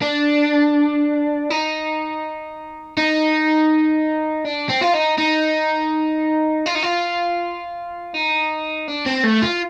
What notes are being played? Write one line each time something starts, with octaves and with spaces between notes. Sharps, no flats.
D4
D#4
D#4
D4
C4
F4
D#4
D#4
F4
D#4
F4
D#4
D4
C4
A3
F4